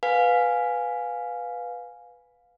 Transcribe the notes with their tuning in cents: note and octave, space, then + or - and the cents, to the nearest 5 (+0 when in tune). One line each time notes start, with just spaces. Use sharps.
B4 +0 F5 +20 G#5 +0